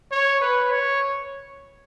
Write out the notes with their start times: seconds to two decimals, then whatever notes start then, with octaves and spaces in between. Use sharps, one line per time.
0.12 C#5
0.41 B4
0.70 C#5